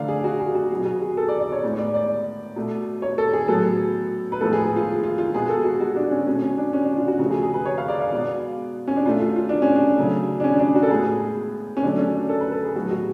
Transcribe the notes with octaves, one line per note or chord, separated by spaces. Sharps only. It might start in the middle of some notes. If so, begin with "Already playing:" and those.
Already playing: D3 F3 A3 D5 F5
G#4
F#4
G#4
F#4
B2 F#3 B3 G#4
F#4
G#4
A4
D5
D5
C#5
A2 G#3 B3
D5
D5
B2 A3
C#5
A4
G#4
A2 F#3 B3 A4
B4
A2 F3 G#3 B3 A4
G#4
F4
F4
F4
B2 G#3 B3 G#4
A4
F#4
F#4
D4
C#4
B2 A3 C#4
C#4
D4
C#4
D4
F4
F#4
C#3 F3 A3 F#4
G#4
G#4
B4
C#5
F5
D5
F5
B2 G#3 B3 D5
C#4
D4
B2 A3 F4
F4
F4
D4
C#4
D4
C#3 F#3 A3
D4
C#4
D4
F#4
A4
A2 G#3 B3 G#4
C#4
D3 F#3 A3 D4
C#4
D4
A4
B4
A4
G#4
A2 F#3 B3 F#4
F#4